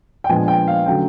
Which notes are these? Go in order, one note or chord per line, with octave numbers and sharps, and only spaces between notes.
G5
A#2 F3 G#3 B3 D4 G#5
G5
F5
D3 F#3 A3 C#4 G5